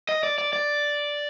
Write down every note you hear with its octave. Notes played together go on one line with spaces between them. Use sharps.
D#5
D5
D5
D5